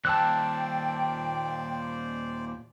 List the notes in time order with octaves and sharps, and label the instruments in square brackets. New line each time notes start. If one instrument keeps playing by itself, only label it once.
[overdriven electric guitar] D#2 A#2 [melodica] C5 D5 [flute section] G5 [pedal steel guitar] A5 E6 F#6